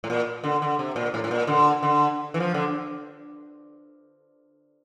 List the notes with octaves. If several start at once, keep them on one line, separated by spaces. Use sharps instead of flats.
A2
A#2
D3
D3
C3
A#2
A2
A2
A#2
D3
D3
E3
F3
D3